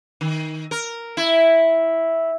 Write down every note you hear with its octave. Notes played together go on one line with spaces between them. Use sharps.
D#3
A#4
E4